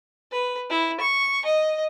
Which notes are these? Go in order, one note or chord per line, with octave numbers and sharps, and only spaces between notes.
B4
E4
C#6
D#5